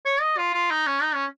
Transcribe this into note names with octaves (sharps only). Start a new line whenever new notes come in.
C#5
D#5
F4
F4
D#4
C#4
D#4
C#4